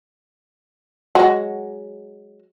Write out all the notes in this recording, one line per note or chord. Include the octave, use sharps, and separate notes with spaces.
F#3 G#3 F#4